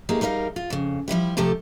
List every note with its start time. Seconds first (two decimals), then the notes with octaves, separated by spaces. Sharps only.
0.09 A3 A#3 D#4 G4 G#4
0.21 G3 D#4 A#4 E5 F5
0.56 F4
0.70 F2 C#3
1.08 F3 G3 E4 G4
1.37 C3 F3 A3 G4 A4